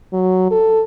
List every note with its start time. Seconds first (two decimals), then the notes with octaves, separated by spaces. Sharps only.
0.13 F#3
0.51 A4